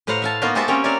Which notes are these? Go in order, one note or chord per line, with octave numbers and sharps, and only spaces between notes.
A2 B4 C5 F5 F#5 A#5
E5 F5 A5
A#3 B3 D#4 F4 F#4 B4
G#3 F#4 G4 C5 E5 A5
A#3 C4 C#4 C#5 D#5 G5
A#4 C#5 D5 E5 F5